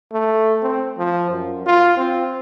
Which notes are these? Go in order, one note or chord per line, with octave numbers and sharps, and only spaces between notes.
A3
C4
F3
F#2
F4
C4